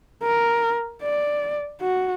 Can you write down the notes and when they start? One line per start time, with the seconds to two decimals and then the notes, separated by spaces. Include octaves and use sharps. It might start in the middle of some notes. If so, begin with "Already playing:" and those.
0.23 A#4
1.02 D5
1.81 F#4